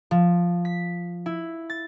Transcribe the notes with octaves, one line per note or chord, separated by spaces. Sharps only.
F3
B6
E4
A6